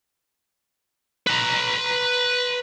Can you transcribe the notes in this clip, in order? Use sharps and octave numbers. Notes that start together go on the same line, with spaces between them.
B4 A#5